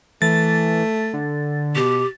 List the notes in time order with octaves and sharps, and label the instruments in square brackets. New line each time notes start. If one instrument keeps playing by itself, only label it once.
[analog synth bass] E3 [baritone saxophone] A3 [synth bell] A6
[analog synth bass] D3
[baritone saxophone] B2 [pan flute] G4